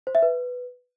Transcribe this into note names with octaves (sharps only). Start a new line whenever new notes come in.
C5
E5
B4